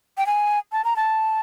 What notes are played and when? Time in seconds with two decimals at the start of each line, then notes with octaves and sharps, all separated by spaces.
0.18 G5
0.26 G#5
0.72 A5
0.85 A#5
0.96 A5